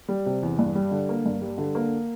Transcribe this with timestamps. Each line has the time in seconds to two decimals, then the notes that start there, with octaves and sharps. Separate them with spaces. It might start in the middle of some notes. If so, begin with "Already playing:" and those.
0.09 G3
0.26 C3
0.43 E2
0.59 G2
0.75 G3
0.91 D3
1.09 A#3
1.26 G2
1.41 G3
1.58 D3
1.75 A#3